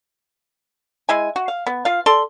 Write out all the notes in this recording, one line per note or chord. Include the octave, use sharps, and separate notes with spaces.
G#3 E4 G#5
F#4
F5
B3
F4 F5
A4 D5 C6